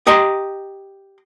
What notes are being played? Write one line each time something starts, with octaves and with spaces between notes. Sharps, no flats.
G4 D#5 A#5 C6